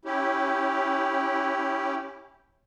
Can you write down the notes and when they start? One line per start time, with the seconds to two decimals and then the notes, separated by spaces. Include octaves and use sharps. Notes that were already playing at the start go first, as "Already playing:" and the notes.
0.05 C#4 E4 G4